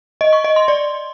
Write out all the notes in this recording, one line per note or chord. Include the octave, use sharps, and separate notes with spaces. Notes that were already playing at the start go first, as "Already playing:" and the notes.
D#5
C#6
D#5
C6
D5